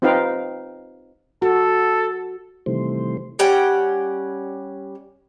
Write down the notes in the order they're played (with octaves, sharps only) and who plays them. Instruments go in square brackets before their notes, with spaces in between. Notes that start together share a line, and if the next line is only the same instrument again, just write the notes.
[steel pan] C4 D#4 F4 B4 F5 G5
[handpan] F#4 [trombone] A4
[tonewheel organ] C3 D#3 E3 G3 A3 C5
[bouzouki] G3 C#4 F#5 G5